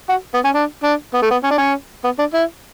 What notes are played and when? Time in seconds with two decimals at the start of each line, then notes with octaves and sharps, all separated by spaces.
0.09 F#4
0.34 B3
0.44 C#4
0.54 D4
0.84 D4
1.14 B3
1.22 A3
1.31 B3
1.44 C#4
1.51 D4
1.58 C#4
2.04 B3
2.19 D4
2.34 E4